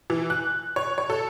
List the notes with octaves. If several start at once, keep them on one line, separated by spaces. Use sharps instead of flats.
E3
F#6
C#5
C#5
A4